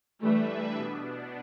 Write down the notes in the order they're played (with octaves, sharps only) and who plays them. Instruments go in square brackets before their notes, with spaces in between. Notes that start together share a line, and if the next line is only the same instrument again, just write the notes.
[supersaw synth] E3 G3 D4 B4 E5 [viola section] A3
[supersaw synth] B2 B3 D4